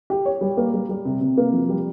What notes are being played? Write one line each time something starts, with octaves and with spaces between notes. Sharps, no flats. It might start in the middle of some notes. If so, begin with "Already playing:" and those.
G4
C#5
G3
A#3
G3
G3
C3
C3
A#3
F3
G3